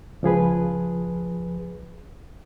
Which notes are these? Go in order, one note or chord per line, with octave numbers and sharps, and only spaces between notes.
C#2 F3 G#4 B4